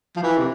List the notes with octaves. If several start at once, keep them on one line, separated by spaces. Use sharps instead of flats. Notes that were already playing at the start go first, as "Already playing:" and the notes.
F3
E3
C3